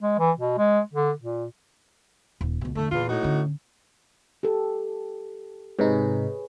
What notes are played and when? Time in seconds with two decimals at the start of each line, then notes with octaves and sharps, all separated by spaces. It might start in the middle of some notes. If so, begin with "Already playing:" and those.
0.01 G#3
0.19 E3
0.39 B2
0.58 G#3
0.93 D3
1.20 A#2
2.41 D#1
2.61 C#2 B2
2.75 E2 D3 A3
2.91 E2 A#2 F4
3.08 A2 D#4 F#4
3.23 D3 C#4
4.43 G4 A4
5.79 G#2 C3 D#4 G#4 B4 C#5